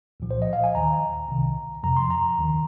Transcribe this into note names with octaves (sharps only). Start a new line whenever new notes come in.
C2 A#2 F3
C5
D#5
F5
G#5
D#2 D#3 A#5
C2 C3 D#3
F2 C3 F3 A#5
C6
A#5
D#2 D#3